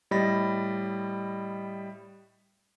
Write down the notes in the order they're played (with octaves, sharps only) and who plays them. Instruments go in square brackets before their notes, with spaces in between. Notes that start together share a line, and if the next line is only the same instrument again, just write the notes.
[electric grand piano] A2 G3 D#5 B5 A6 A#6